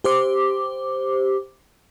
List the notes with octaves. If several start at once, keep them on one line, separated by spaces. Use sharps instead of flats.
G4 C5 D6